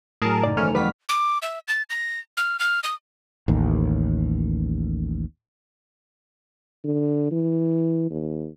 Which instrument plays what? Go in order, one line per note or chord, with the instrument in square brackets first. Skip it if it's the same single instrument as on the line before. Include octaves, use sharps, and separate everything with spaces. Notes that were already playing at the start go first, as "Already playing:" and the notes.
[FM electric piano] A2 F#3 [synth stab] G#4 A#4 A5
[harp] F#1 D#4 A#4 [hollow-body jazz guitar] D5
[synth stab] G#2 C#4 [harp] D#3 E3 [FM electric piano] A3 F6
[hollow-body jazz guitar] F2 B3 B4 [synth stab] G3 B6 [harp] F#5 C#6 D6
[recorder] D6
E5
A6
A#6
F6
F6
D#6
[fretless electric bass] A1 D#2
[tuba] D3
E3
D#2